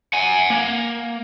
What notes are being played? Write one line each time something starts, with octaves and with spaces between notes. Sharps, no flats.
F#5 G#5
A#3